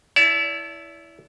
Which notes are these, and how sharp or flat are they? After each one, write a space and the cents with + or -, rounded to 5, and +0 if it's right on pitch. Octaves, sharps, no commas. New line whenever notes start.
E4 +0 D5 -40 A5 +15